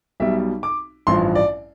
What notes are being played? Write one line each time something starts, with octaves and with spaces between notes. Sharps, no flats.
B1 B2 G3 E5
D6
A1 G2 F3 C6
D5